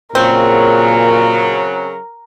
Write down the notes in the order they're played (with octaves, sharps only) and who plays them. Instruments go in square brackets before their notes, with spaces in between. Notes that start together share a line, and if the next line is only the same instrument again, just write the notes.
[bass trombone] A#2 [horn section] C#3 F#3 [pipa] C4 [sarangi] A#4